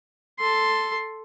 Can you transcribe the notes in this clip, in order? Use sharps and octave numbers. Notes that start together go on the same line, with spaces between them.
A4 C6